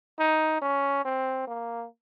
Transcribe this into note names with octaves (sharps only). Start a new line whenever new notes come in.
D#4
C#4
C4
A#3